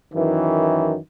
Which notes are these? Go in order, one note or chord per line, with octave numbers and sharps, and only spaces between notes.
F#2 D#3 E3